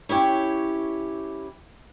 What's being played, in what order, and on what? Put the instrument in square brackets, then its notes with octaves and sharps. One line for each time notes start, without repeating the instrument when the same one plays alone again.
[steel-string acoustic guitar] C#4 E4 G4 C#5